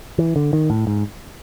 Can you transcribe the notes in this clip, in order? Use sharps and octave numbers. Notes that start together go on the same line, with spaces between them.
E3
D3
D#3
A2
G#2